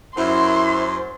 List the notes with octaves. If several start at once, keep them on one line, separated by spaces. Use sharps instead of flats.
F#2 E4 C5 C6